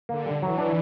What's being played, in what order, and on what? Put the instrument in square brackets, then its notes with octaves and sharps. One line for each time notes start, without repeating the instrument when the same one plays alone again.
[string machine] D3 [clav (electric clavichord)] A#3
[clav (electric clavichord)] G3
[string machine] E3 [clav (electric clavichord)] F#3
[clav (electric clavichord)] D4